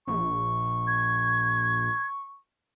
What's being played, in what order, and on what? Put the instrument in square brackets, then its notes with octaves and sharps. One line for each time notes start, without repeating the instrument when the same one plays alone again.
[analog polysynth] A#1 [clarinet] C#6
[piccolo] G#6